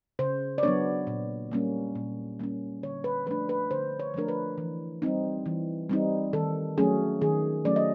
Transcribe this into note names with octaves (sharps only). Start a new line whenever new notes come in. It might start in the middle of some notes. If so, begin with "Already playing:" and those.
C#3 C5
D5
F#3 B3 D4 C#5
A#2
G3 A#3 C#4
A#2
G3 A#3 C#4
D3 C#5
B4
F3 A3 D4 B4
B4
D3 C5
C#5
F3 A3 D4 A#4
B4
E3
G3 C4 D#4
E3
G3 C4 D#4
D#3 A4
F#3 A3 C#4 G#4
D#3 G#4
F#3 A3 C#4 D5
D#5